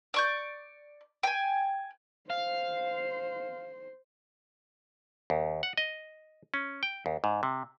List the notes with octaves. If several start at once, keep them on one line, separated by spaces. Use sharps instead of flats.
D5 C#6 G6
G5 G#5
C5 F5
D#2
F#5
D#5
C#4
G5
D#2
G#2
C3